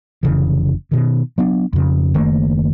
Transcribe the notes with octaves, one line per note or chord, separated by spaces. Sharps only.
F1 C#3 E3
B2 D#3
F#3 B3 D4
F2 C#3
F#1 D#3 A3 A#3